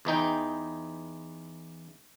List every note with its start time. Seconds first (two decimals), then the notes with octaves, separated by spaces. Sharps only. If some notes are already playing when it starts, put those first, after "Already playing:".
0.05 E2 E3 D#4 G5